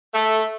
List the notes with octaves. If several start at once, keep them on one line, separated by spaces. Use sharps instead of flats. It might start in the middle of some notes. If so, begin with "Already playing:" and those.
A3